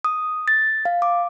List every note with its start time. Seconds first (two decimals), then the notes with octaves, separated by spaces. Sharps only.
0.05 D#6
0.48 A6
0.85 F5
1.02 D6